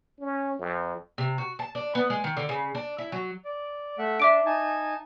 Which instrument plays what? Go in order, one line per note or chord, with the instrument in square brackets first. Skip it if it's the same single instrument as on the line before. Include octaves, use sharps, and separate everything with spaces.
[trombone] C#4
F2
[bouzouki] C3
F#4
A5
D4
B3
G#3
D#3
D3
C#3
D4
E4
F#3
[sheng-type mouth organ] D5
A3 E5 F#5
[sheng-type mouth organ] D4 [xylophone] E5 D6 D7
[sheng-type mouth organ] D#4 G#5 A5